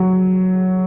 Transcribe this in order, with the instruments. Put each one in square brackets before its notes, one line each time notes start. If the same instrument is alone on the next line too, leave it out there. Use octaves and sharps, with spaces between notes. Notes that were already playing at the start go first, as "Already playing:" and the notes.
Already playing: [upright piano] F#3